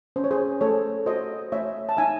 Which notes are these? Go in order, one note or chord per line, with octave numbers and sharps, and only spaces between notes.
C#4 C5
C#5
G#4 C5
A3 A4 C#5
F#4 C5 D#5
A3 C#5 E5
A5
D#4 E5 G#5